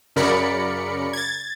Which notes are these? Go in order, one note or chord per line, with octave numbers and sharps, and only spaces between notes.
F#2 C#3 A#4 D5 B5 C#7
G#6 A6